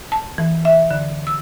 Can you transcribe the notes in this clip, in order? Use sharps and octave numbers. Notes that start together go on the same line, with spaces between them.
A5
E3
E5
D3
E6